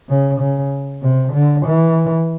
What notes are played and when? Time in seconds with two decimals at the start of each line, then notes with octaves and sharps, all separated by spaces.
0.09 C#3
0.40 C#3
1.03 C3
1.34 D3
1.66 E3